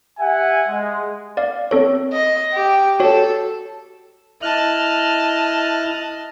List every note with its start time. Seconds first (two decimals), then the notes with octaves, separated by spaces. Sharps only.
0.19 G4 E5 F#5 G#5
0.69 G#3
1.37 D5 F5
1.71 C4 A4 C#5
2.13 D#5
2.54 G4
3.00 F#4 A4 C#5
4.42 E4 D#5 A5 F6 F#6